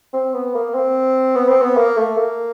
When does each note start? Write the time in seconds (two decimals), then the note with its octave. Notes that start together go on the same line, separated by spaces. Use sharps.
0.13 C4
0.34 B3
0.55 A#3
0.75 C4
1.35 B3
1.48 C4
1.61 B3
1.77 A#3
1.97 A3
2.17 A#3